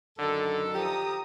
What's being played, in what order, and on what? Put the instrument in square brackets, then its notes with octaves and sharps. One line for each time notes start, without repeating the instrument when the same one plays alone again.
[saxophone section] F#2 D#3 A4 [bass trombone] D3
[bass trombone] F3 [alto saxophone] G4 [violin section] A#5 D#6